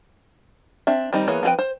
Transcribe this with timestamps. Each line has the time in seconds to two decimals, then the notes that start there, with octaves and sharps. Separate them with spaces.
0.87 C4 D4 E5
1.13 D#3 G3 C4 D#4
1.28 E3 A#3 B3 G#4 C#5
1.43 F3 C4 G#4 B4 G5
1.59 C5